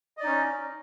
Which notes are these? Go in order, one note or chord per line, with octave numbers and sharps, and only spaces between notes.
C#4 D#4 D5 D#5